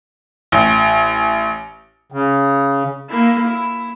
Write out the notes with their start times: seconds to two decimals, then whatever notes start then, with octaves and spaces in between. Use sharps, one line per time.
0.52 A1
2.12 C#3
3.09 A#3 E4
3.46 E4